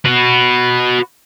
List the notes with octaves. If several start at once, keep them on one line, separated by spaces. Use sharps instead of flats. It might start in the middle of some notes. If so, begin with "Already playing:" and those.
F#4 B4